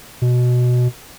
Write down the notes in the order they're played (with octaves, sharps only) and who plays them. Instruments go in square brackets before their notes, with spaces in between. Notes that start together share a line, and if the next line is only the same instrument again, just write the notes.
[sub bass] B2